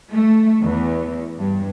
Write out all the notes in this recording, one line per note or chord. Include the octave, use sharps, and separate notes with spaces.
A3
E2
G2